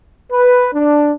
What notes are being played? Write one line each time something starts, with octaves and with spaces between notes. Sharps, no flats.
B4
D4